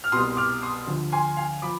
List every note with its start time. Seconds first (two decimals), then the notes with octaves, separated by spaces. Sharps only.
0.04 F6
0.12 C2 B2 C6 D#6
0.37 D6 F6
0.62 C6 D#6
0.87 D2 D3 F3
1.12 G#5 C6
1.37 F5 G#5
1.62 F3 B5 D6